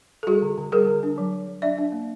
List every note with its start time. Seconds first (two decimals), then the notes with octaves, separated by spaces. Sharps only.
0.23 A4
0.27 G3 F#4 G#4
0.42 D3
0.58 D3
0.72 G3 G#4 A#4
0.87 D3
1.03 D4
1.18 F#3
1.33 F#3
1.48 F#3
1.62 D4 D5 E5
1.78 D4
1.92 A#3